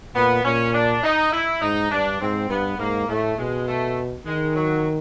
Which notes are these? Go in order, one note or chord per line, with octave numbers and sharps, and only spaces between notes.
A#2 B3
A#2 C#4
D4
D#4
E4
G#2 D#4
G2 D4
G#2 C4
G2 B3
G#2 A#3
A2 A3
B2 G#3
A3
D#3 G#3
F#3